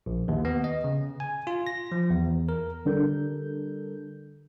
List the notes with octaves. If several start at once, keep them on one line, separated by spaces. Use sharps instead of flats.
A#1
D#2
B3
D#5
C#3
G#5
F4
A#6
F3
E2
A#4
D3 G3 D4 A4 A#4 G6